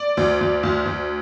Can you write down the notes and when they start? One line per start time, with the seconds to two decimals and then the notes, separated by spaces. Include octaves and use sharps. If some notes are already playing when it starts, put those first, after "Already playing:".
Already playing: D5
0.17 D2
0.41 D2
0.63 D2
0.86 D2